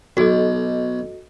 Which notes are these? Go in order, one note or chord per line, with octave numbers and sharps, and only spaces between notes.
B1 F#4 A4 D#5